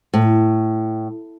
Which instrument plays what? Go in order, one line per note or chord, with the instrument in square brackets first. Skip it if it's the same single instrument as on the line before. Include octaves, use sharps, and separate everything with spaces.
[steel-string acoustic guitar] A2